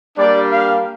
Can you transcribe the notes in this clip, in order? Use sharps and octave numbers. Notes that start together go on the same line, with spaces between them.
G3 A#3 D4 G4 D5
F5